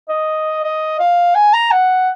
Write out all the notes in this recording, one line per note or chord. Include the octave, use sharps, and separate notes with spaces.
D#5
D#5
F5
G#5
A#5
F#5